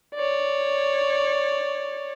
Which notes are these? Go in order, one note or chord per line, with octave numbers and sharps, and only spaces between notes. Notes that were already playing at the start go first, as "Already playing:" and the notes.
C#5 D5